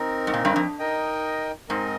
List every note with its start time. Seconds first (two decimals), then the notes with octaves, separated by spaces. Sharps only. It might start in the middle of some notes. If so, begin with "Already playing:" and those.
Already playing: C4 D#4 A#4
0.27 G#2
0.34 A#2
0.45 G2
0.56 F2
0.79 D#4 A#4 D#5 G5
1.69 G#2 C4 D#4 A#4 D#5